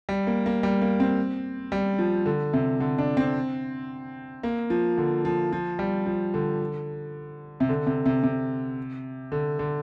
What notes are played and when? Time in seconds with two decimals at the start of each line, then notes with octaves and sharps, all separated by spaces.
0.09 G3
0.27 A#3
0.46 A#3
0.63 G3
0.82 A#3
1.00 C4
1.72 G3
1.99 F3
2.26 D3
2.53 C3
2.80 D3
2.98 D4
3.17 C4
4.43 A#3
4.70 F3
4.98 D3
5.25 F3
5.53 F3
5.79 G3
6.06 F3
6.34 D3
7.60 C3
7.69 D3
7.87 C3
8.06 C3
8.23 C3
9.32 D3
9.59 D3